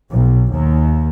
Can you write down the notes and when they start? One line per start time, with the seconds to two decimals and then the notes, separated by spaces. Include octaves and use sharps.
0.11 B1
0.51 D#2